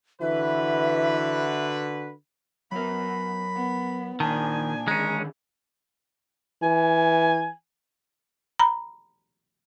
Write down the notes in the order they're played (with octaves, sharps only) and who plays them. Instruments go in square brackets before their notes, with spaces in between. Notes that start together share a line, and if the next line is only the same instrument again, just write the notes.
[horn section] D3 F#4 B4 [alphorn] E3 [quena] E5
[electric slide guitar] F#3 A#4 [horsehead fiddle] B3 [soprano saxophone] B5
[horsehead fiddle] B3
[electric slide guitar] A#2 A#3 A5 [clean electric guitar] D#3 [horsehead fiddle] D4 G#5
[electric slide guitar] D3 D#3 G#4 [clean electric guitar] G#3 C#4 [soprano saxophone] A#5
[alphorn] E3 [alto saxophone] G#5
[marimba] A#5 B5